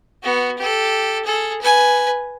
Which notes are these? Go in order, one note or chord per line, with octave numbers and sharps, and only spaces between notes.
B3 F#4
G4 A4
G#4 A4
B4 G#5